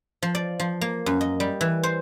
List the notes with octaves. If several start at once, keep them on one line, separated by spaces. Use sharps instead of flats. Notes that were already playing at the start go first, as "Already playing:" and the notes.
F3
D5
F3
A#3
F#2
D#5
G3
E3
C5